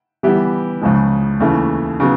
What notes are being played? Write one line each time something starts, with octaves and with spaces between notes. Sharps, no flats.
E3 G3 B3 E4 G4
C#2 C#3 F3 G#3
D#2 C#3 E3 A3
C#3 F#3 B3